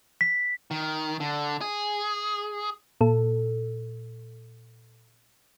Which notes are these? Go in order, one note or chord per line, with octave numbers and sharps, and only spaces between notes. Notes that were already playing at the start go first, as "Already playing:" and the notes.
B6
D#3
D3
G#4
A#2 A4